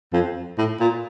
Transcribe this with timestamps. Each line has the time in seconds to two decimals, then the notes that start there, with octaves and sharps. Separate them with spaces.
0.13 F2
0.58 A2
0.80 A#2